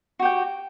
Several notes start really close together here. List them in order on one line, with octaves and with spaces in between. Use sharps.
F#4 G4 G5